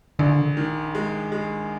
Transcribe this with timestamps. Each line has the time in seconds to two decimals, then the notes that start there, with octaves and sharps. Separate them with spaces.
0.19 A#1 D3
0.57 D#3
0.95 G#3
1.32 G#3